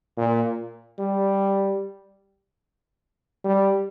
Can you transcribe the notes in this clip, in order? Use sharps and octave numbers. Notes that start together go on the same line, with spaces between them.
A#2
G3
G3